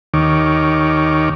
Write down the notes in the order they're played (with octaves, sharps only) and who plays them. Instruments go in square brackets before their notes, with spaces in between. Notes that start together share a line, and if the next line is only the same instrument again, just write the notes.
[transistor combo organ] D#2 D#3 C#5 D6